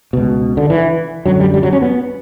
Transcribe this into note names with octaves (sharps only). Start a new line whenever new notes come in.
C#2 B2
D3
E3
F#2 D3 F#3
G3
G3
F#3
C#4
B3